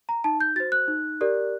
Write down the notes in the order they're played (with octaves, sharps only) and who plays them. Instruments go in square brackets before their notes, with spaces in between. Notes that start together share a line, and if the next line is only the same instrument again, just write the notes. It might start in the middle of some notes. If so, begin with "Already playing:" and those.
[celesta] A#5
D#4 A5
G6
F#4 C5 A6
F#6
D#4
G4 A#4 D5